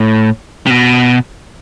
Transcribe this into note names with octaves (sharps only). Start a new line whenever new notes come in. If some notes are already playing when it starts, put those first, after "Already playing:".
Already playing: A2
C3
B2